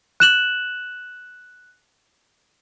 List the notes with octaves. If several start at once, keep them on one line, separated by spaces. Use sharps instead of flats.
F#6 E7 F#7